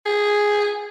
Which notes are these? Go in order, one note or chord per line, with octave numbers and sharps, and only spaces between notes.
G#4